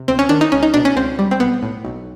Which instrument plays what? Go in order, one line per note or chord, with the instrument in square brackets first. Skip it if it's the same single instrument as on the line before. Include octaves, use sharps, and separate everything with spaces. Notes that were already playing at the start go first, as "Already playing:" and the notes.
Already playing: [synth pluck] C3
D2 C4
C#4
D#3 D4
D#4
C#2 C#4
D#4
B2 D4
C#4
C#2 C4
G3
C4
B1 B3
A2
B1